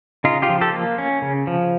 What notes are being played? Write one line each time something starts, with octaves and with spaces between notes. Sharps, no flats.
C#3 D#4 F4
F4 G4
F3
G4 A4
A#3
C#4
C#3
F3